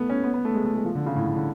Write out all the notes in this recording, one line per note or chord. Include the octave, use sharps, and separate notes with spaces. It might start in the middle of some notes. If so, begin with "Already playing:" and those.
Already playing: A3 B3
C#4
B3
B3
A3
G#3
A3
G#3
F3
D3
C#3
A2
A2
D3